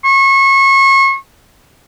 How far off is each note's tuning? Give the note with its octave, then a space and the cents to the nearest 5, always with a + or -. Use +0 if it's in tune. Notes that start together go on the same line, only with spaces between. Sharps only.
C#6 -30